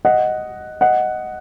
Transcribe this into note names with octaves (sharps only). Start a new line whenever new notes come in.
D#5 F#5
D#5 F#5